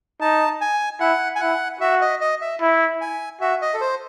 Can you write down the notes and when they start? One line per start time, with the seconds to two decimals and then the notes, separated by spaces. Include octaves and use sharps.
0.21 D#4 A5
0.61 G#5
1.01 E4 F#5
1.36 G#5
1.40 E4 F#5
1.81 F#4 E5
2.01 D#5
2.21 D#5
2.41 E5
2.61 E4
3.01 G#5
3.41 F#4 E5
3.62 D#5
3.74 A4
3.81 C5